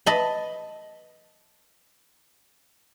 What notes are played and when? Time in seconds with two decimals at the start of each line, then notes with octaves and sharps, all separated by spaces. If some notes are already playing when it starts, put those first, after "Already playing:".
0.06 D#5 A5 B5